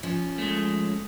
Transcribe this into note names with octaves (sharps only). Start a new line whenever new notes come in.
F3 C#4
G#3 A3